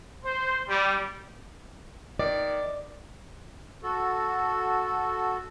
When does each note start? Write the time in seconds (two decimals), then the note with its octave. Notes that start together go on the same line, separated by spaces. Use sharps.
0.24 C5
0.68 G3
2.19 D#3 D5
3.83 F#4 A4